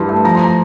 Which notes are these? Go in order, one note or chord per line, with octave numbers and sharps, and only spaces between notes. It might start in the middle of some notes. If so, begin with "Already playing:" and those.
Already playing: G2 E3 C6
A3
F3 A#5
C6
A#5